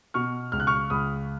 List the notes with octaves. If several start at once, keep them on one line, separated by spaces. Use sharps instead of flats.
B2 C#6 F6
C#2 F6
F#6
C#6 F6
C#2 B5 D#6